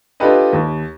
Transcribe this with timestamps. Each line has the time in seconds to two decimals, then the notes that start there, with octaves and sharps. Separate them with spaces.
0.20 D4 F4 G4 A4 B4 D#5
0.53 D#2